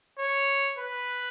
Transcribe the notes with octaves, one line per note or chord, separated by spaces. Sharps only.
C#5
B4